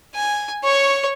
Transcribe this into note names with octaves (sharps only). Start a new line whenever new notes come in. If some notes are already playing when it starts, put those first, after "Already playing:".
G#5
C#5 C#6